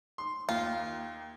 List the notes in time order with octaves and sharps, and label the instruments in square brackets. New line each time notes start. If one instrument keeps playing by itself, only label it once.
[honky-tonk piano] C6
[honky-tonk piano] D#2 [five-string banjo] F4